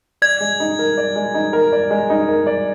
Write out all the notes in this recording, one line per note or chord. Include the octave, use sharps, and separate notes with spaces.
D5 G#6
G#3
D#4
A#4
D5
G#3
D#4
A#4
D5
G#3
D#4
A#4
D5